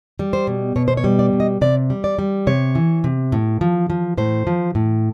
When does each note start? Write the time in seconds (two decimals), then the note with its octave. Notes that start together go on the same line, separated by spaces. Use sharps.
0.19 G3
0.33 C5
0.47 B2
0.76 B2 C#5
0.88 C5
0.97 C#5
1.04 G3
1.19 D5
1.33 B2
1.40 D#5
1.61 C3 D5
1.90 G3
2.04 D5
2.19 G3
2.47 C3 C#5
2.75 E3
3.04 C3
3.32 A2
3.61 F3
3.90 F3
4.18 A2 C5
4.47 F3
4.75 A2